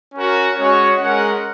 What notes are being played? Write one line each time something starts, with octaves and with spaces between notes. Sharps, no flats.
C#4 F#4 A#4
G#3 C#4 F#4 C#5
G#3 C#4 A#4 F#5